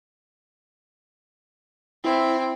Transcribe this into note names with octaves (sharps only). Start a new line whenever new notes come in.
C4 E4